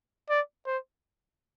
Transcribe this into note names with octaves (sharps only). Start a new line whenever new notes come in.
D5
C5